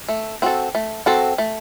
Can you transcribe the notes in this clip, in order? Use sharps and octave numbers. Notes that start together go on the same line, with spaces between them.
A3
C4 F#4 A4
A3
C4 F#4 A4
A3